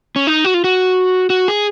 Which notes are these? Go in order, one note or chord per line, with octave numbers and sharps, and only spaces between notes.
C#4
D#4
F#4
F4
F#4
F#4
G#4